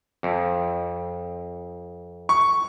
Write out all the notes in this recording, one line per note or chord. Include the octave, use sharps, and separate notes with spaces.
F2
C#6